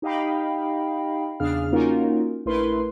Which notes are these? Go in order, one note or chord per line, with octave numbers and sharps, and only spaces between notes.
D#4 G4 D#5 F5 G5 B5
E2 C#3 D4 G#4 F5 F6
A#3 C#4 D#4 F4 F#4 A#4
A#1 A3 E4 A#4 B4 C6